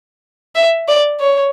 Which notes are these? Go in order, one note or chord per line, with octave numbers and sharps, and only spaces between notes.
E5
D5
C#5